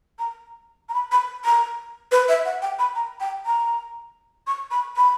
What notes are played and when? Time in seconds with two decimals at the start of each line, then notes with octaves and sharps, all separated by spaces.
0.19 A#5
0.89 A#5
0.94 B5
1.12 B5
1.45 A#5
2.11 B4
2.29 E5
2.45 F#5
2.62 G5
2.79 B5
2.95 A#5
3.20 G5
3.46 A#5
4.47 C#6
4.71 B5
4.96 B5